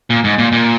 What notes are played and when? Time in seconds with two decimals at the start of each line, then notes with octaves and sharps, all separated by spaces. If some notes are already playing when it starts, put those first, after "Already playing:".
0.10 A#2
0.24 G#2
0.38 A#2
0.52 A#2